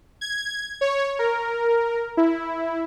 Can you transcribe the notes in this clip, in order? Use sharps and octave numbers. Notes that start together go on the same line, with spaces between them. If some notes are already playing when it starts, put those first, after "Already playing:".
G#6
C#5
A#4
E4